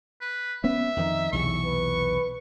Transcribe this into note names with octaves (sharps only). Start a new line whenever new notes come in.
B4
B3 C#4 E5
F2 D#3 F3 D#4
B1 E2 C3 C#6
B4